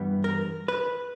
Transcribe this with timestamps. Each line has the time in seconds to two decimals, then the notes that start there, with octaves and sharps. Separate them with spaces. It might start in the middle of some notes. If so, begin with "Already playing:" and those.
Already playing: G2 E3 G3 B3
0.24 A#4
0.68 B4